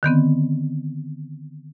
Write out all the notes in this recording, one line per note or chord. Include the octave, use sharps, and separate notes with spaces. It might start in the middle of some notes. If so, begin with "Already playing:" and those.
D3 D#3 B3 C4